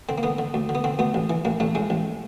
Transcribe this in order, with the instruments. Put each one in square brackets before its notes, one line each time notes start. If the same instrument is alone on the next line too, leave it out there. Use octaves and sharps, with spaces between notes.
[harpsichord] D3 C4
A#3
D3 B3
D3
D2
D3
B3
D3 C4
D2 B3
A1
E3
A1 A#3
A1 A3
A2 G#3
A1